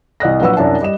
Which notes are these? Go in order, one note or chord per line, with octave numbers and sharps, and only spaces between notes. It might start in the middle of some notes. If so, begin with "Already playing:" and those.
C2 D#5 F#6 A#6
A#1 F#3 B4 F#5 E6
C2 F#2 D4 E5 A5
G3 D#5 E7